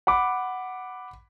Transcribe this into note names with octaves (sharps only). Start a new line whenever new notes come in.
F#5 B5 D6